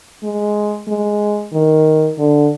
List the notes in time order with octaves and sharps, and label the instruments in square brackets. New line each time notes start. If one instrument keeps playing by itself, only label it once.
[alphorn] G#3
G#3
D#3
D3